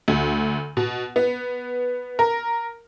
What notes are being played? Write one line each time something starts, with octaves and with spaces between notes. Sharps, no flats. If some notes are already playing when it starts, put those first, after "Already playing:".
D2
B2
B3
A#4